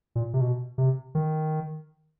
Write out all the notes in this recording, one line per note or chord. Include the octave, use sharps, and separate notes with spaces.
A#2
C3
B2
C3
D#3